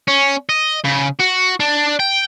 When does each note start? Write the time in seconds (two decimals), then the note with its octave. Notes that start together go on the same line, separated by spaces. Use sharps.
0.08 C#4
0.49 D#5
0.85 C#3
1.20 F#4
1.60 D4
2.00 G5